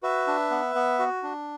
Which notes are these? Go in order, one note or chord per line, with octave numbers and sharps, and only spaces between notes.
F#4 B4 E5
D4
B3
B3
F#4
D4